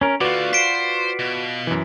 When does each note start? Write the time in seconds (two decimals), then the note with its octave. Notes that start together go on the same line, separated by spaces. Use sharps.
0.01 C#4 A#4
0.21 D3 A3 F4 F#4 B4 D5
0.53 C5 B6 D7
1.19 B2
1.67 F#2 E3